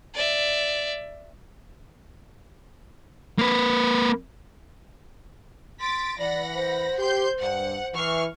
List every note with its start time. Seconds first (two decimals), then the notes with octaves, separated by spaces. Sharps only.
0.15 D5 E5
3.39 A#3 B4
5.81 C6 A6 B6 D7
6.19 E3 D5 F#5 B5 A#6
6.55 C5
6.98 G4 C6 G6
7.41 G2 F#5
7.94 E3 C#6 F6 C7